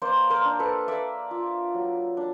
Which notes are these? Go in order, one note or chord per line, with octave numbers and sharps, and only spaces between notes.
A#3 C5 D5
A#4 C5
D4
A4 B4
A#3 D5 E5
F4
F#3
D4